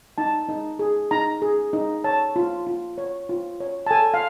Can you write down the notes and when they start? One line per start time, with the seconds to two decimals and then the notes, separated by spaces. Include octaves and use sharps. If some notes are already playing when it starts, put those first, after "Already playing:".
0.18 D#4 A5
0.48 D#4
0.79 G#4
1.11 D#4 A#5
1.42 G#4
1.73 D#4
2.04 C#5 A5
2.36 F4
2.67 F4
2.98 C#5
3.29 F4
3.60 C#5
3.86 A5
3.91 A4 G#5
4.14 F5